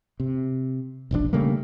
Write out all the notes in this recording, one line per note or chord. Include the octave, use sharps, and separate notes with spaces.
C3
E1 A#1 A2 D4
C#3 G3 A3 A#3